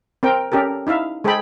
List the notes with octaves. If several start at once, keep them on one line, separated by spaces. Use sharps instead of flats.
C4 A#4 G5
C#4 G4 A4 A#4
D#4 E4 E5 F5
G#3 G#4 A4 C5 G5 B5